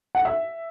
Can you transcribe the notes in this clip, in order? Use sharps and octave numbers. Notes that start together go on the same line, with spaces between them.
F#5
E5